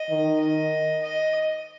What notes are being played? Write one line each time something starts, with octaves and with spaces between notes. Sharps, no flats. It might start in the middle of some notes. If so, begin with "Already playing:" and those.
Already playing: D#5
D#3
D#5
D#5